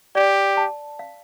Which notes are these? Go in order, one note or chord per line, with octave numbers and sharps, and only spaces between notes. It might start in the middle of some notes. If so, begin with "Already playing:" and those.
G4 D5
A5
F5